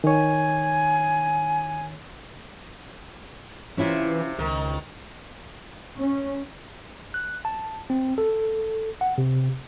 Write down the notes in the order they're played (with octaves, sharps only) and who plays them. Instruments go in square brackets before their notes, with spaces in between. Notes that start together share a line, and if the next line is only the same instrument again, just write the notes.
[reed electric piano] D#3 C#5 [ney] G#5
[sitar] C3 [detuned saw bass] E3 [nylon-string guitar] C#4 E4 F4
[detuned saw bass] C#2 [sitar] D#3 [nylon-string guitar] A#4
[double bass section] C#4
[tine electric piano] F#6
A5
C4
A4
F#5
C3